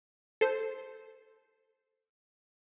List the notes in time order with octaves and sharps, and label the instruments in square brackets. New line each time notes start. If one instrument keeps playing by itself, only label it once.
[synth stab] A4 C5